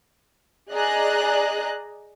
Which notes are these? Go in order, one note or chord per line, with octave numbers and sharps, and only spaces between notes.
G#4 D5 D#5 A#5 F#6